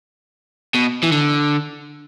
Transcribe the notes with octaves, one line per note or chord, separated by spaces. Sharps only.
B2
E3
D3